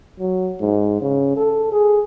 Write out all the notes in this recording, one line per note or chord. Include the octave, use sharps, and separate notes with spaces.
F#3
G#2
C#3
A4
G#4